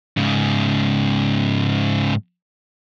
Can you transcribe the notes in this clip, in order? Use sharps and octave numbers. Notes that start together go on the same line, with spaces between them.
G#2 C#3